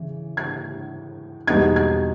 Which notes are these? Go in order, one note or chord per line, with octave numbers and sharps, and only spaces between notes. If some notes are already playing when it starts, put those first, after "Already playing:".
Already playing: C#3 E3
G#6
E2 B2 G3 B3 D#4 G#6
G#6